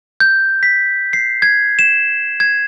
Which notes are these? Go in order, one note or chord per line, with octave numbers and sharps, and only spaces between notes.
G6
B6
C7
G#6
E7
G#6